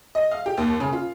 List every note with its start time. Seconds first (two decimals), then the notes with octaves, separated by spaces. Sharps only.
0.15 D#5
0.31 F5
0.46 G4
0.57 D#2
0.80 C#3
0.92 F4